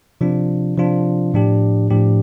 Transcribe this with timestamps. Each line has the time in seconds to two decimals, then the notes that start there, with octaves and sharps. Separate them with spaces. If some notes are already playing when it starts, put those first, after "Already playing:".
0.21 C3 F3 D4 F4
0.77 C3 F3 D4 F4
1.34 A2 F3 D4 G4
1.90 A2 F3 D4 G4